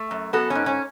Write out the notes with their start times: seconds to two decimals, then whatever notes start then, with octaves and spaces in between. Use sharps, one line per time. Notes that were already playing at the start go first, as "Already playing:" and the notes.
Already playing: A3
0.11 F#2
0.33 B3 F#4 A4
0.50 G#2 C#4
0.66 C#4